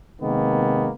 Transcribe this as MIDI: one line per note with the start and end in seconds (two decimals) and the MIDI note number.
0.21 0.90 48
0.21 0.90 51
0.21 0.90 56
0.21 0.90 58
0.21 0.90 59